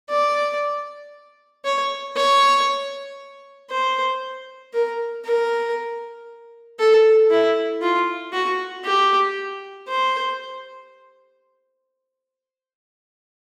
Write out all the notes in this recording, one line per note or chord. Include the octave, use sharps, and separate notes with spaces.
D5
C#5
C#5
C5
A#4
A#4
A4
E4
F4
F#4
G4
C5